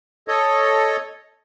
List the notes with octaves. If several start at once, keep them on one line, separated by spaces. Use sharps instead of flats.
A4 C#5 D#5